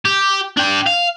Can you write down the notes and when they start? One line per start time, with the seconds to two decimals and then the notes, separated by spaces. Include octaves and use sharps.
0.05 G4
0.57 D4 G5
0.86 F5